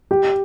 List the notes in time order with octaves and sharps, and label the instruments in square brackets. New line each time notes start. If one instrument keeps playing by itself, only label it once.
[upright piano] G4